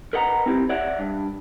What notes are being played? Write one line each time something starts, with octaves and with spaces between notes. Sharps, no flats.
A#4 B4 D#5 F#5 G5 A#5
C4 E4 G4
C#5 D5 E5 F#5
G2